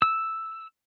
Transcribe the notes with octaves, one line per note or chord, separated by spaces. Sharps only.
E6